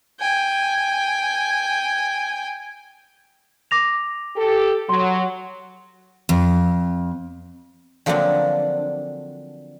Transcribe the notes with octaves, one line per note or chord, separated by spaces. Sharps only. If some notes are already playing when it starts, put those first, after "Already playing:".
G5 G#5
D6 A#6 F7
G4 A4
F#3 C6
F2
D3 F3 F#3 A#3 C4 D4